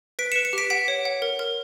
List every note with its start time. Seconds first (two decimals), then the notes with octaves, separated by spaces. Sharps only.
0.19 B4 B6 D7
0.32 B4 C#7 E7
0.45 C#7 E7
0.53 G4 B6 D7
0.70 F#5 B6 D7
0.88 C#5
1.05 F#5
1.22 A#4
1.39 A#4